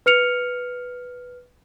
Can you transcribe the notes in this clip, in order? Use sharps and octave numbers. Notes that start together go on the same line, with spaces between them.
B4 F6 C#7 F7